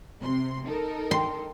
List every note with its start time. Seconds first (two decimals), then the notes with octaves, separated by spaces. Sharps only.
0.21 C3 C6
0.66 D#4 A4 A#4
1.11 C6